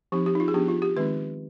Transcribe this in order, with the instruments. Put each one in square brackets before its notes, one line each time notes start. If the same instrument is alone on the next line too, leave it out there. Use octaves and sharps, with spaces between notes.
[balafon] F3 C4 D#4 G4
G4
D#4
F4
G#4
F3 B3 D4 G4
F4
G4
D#3 G#3 C4 D#4 B4